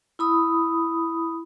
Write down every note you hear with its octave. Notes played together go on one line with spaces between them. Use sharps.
E4 B5 D#6